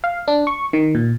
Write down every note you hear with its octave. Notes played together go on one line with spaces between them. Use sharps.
F5
D4
C#6
D#3
A#2